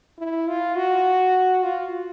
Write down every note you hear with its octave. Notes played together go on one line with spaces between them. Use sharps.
E4
F4
F#4
F4